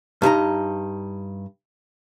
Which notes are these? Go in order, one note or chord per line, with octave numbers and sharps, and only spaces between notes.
G2 D#4 G#4 A#5